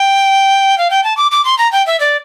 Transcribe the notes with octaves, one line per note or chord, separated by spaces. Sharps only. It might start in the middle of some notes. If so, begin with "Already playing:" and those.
Already playing: G5
F5
G5
A5
D6
D6
C6
A#5
G5
E5
D5